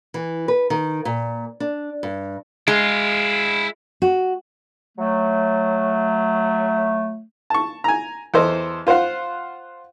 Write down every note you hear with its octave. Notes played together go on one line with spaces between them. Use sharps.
E3
B4
D#3
A#2
D4
G2
G#3 E4 F5
F#4
F#3 A3
A5 C#6
G#5 A#5
E2 A4 C5 D#5
F4 C5 F5 F#5 C6